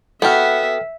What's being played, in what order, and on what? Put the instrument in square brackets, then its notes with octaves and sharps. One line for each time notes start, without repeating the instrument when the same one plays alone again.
[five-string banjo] B3 F#4 [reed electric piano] A4 G5 F6 [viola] E5